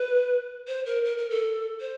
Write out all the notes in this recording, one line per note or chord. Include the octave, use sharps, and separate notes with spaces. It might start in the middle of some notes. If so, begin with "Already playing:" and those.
Already playing: B4
C5
A#4
A#4
A#4
A4
C5